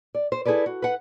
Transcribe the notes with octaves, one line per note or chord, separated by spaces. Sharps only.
D5
C5
E4 G#4 A4 B4 D5
F#4
B4 F#5